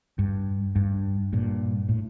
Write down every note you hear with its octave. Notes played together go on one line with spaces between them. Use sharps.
G2
G2
G2 A#2
A2